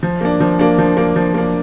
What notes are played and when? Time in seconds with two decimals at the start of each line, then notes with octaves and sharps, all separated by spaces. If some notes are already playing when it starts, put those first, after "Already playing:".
0.03 F3
0.21 A#3 D4
0.40 F3
0.59 A#3 D4
0.78 F3
0.97 A#3 D4
1.16 F3
1.34 A#3 D4